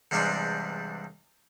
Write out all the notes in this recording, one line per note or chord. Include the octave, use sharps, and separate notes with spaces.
E2 G2 C3 G3 G#3 D4